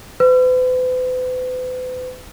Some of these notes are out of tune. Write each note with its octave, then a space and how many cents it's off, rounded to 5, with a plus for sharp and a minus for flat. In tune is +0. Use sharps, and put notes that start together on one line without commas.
B4 +45